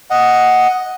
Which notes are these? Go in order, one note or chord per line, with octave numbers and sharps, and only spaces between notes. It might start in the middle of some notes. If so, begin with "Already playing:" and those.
D#5 F#5